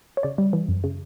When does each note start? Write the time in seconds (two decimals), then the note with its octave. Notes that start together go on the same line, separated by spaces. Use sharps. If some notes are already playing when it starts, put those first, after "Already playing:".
0.17 C#5
0.23 C#3 D5
0.38 G3
0.53 E3
0.69 F#2
0.84 C#3